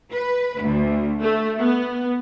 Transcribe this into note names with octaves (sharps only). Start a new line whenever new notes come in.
B4
D2
A3
B3